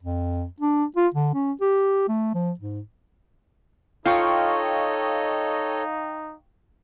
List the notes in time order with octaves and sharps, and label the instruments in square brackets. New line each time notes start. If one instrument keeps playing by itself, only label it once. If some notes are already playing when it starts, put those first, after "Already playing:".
[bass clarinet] F2
D4
F4
D3
C#4
G4
A3
F3
G#2
[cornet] D#4 [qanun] F4 [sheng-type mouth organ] A4 C#5 D#5 [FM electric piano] F5 G5 C#6